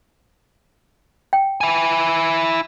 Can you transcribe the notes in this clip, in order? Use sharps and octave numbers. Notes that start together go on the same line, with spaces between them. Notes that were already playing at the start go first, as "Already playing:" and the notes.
G5
E4 G#5